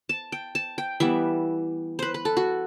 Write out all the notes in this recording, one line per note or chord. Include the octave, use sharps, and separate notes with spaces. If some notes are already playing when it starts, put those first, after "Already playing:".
A5
G5
A5
G5
E3 G3 B3 E5
B4 C5
B4
A4
F#4